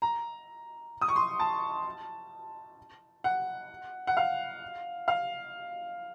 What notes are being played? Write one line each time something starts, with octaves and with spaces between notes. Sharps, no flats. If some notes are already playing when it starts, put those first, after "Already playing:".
A#5
D#6
C#6
C6
A5
F#5
F#5
F5
F5